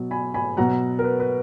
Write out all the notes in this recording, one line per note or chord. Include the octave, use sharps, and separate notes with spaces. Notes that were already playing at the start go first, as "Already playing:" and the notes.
Already playing: B2 F#3
G#5 B5
G#5 B5
B2 F#3 F#5 A#5
A#4
B4
B4